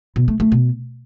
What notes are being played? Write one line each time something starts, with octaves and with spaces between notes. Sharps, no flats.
B2
A3
A3
B2